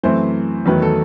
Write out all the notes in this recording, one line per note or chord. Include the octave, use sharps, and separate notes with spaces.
F#2 E3 A3 C4 C5
E2 D#3 F#3 A3 B4
A4